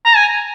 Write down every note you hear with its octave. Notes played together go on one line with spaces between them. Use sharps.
A#5
G#5